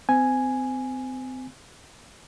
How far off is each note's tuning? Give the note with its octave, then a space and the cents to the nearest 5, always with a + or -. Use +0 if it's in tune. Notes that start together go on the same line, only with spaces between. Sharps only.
C4 -30 G#5 +0